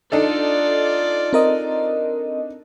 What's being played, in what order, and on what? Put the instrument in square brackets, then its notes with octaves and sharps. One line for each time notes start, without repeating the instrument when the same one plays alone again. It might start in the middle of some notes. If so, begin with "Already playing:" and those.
[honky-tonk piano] D4 D#4 A4 [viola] F4 D5
[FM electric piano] C4 A#4 D#5